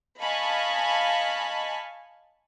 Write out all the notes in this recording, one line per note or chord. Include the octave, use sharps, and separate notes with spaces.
D#5 F5 G#5 A5 B5 C#6